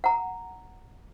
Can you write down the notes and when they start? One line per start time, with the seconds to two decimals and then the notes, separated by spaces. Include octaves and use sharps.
0.04 F#5 A#5